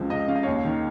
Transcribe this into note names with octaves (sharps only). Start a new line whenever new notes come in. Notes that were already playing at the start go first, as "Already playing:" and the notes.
Already playing: C#2 C3 F3
C#2 D#5
C#3 F5
D#5
D#2 C#5 F5
D#3